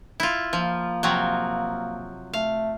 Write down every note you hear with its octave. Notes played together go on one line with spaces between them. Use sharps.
E4 F4
F3 A#3
C3 F3 F#3
A3 F5